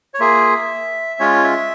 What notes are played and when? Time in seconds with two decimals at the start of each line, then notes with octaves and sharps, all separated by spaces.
0.14 C#5
0.20 A#3 F4 G#4 E5
1.20 G#3 C#4 F4 C#5
1.44 E5